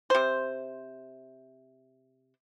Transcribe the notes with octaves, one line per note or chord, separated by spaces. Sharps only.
C3 C5